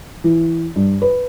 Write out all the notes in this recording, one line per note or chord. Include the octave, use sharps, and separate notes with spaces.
E3
G2
B4